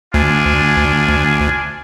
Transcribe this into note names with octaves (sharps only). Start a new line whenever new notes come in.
D2 D4 F4 G#5